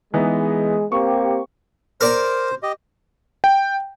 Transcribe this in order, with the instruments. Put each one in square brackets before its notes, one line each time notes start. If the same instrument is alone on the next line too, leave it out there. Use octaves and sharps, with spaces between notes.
[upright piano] E3 B3 D#4 [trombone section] G#3
[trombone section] A#3 C4 G4 [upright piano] C#6
[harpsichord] A#4 D5 A#5 [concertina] C5
[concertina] G4 D#5
[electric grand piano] G5